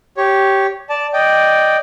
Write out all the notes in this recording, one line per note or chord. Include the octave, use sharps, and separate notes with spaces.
G4 C#5
D5 A5
D5 D#5 G5